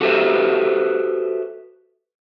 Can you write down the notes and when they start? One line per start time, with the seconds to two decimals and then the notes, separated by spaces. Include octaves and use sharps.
0.01 F#4 G4 A4 B4 C5 E5